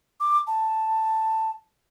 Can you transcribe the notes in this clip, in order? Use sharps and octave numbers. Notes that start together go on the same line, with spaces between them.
D6
A5